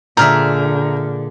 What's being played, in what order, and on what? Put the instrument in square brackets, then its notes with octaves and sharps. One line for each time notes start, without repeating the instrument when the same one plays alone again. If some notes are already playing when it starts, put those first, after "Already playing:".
[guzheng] A#2 G#4 E5 [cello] D3 [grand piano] A#5 [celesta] F6 G6